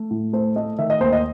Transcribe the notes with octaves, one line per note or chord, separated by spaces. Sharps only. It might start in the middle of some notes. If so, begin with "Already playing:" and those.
Already playing: A3
A2
A3 C5
A3 D#5
D#3 E5
D#5
D#2 C5
D#5